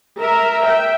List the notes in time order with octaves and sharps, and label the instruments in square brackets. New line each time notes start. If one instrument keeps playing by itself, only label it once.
[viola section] A#4 E5
E5 G5